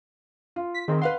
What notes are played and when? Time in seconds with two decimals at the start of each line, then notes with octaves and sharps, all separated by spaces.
0.56 F4
0.74 B6
0.88 D#3 C4 G#4 A#4
1.01 B4 F5 F#5 C6